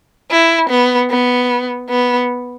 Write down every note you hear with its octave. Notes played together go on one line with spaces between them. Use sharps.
E4
B3
B3
B3